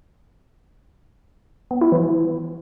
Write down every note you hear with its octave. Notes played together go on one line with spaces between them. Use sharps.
B3
E4
E3